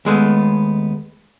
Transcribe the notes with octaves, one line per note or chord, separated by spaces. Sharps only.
D#2 G#3 A3 B3